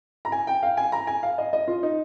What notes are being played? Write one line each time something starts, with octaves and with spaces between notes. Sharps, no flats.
A#5
G#5
G5
F5
G#5
A#5
G#5
F5
D#5
D#5
F4
D#4